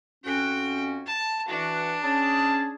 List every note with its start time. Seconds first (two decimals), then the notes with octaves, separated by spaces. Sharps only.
0.25 F2 C#4 F#4 G5
1.06 A5
1.49 E3 D4 F#4
2.03 C#4 G#4 A5